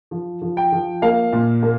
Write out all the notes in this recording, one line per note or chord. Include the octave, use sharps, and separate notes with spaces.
F3
F3
G5
F3
A#3 F5
A#2
A#3